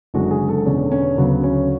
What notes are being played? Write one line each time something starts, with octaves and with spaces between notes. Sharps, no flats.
F#1 F#2 D3 G#3 F#4
G#4
A4
E1 E2 D3 C#4
C#4
D2 C#3 F#3 B3
C#4